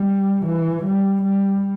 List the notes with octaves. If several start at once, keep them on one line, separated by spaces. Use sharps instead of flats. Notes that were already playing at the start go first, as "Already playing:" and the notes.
Already playing: G3
E3
G3
G3